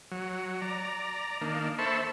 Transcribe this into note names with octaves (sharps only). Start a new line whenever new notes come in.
F#3
D5 A#5
D#3 A#3 D4
A4 C5 E5 A5 B5 C#6